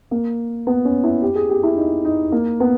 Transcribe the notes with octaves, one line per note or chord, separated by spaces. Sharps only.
A#3
B3
C#4
E4
G4
G#4
G4
E4
D#4
D#4
A#3
B3